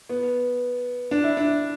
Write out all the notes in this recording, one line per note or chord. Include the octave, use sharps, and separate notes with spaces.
B3
D4
E4
D4